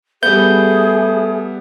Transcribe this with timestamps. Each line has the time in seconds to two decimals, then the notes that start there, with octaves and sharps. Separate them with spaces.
0.23 G3 A3 B3 G#4 G6